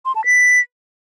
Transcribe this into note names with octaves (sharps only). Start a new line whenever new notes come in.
C6
A5
B6